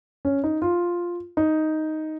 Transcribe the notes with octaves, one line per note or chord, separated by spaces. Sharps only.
C#4
D#4
F4
D#4